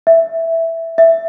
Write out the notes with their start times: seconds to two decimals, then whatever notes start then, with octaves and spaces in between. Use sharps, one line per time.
0.07 E5
0.98 E5